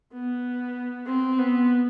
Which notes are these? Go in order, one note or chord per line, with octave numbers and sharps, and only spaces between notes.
B3
C4
B3